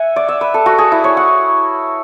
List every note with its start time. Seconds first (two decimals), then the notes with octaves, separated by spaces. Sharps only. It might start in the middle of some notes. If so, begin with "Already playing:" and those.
Already playing: E5 F#5 G#5
0.16 D5
0.29 E5
0.41 B4
0.54 A4
0.66 F#4
0.79 G#4
0.92 E4
1.04 C#5
1.17 F#5